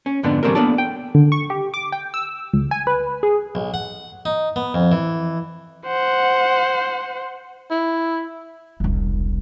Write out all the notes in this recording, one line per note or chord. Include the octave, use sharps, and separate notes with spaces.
C#4
F2 G#2 D3 B3 D4
E3 G3 A3 C4 D4 A#4
A#3 B3 D4 A4 D5 A5
G5
D3
C#6
G4
D6
G5
E6
C#2
G#5
B4
G#4
B1
F#5
D#4
B3
F2
E3
C5 F#5
E4
E1 C2